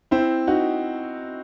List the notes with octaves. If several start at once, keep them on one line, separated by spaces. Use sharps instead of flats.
C4 E4
D#4 F#4